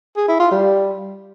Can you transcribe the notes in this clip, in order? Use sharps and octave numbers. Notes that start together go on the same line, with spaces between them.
G#4
E4
F4
G3